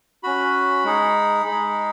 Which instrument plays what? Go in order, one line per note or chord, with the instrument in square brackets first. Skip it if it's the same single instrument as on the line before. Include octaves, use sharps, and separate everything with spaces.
[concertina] C#4 F#4 B5
G#3 D#4 G#4
G#3 D#4 G#4